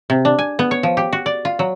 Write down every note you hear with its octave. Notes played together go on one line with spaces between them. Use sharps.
C3
D4
G#5
B3
C#5
F3
G4
F#4
D5
F4
F#3